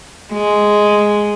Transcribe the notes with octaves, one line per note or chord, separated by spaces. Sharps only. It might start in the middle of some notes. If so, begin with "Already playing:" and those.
G#3